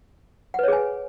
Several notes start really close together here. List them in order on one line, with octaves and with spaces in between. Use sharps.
F#5 B4 C#5 G#4 G#5